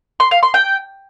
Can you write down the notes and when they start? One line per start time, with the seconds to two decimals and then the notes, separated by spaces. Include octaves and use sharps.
0.20 C6
0.31 F5
0.43 C6
0.54 G5